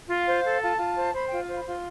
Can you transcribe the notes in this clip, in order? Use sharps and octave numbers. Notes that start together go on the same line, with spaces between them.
F4 F5
C5
A4
F4 A5
F4
C5
C5 B5
F4 G5
F5
C5
B5
F4 C6